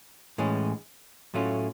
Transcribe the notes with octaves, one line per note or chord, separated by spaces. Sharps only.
A2 E3 G#3 C#4
A2 F#3 A3 C#4 F4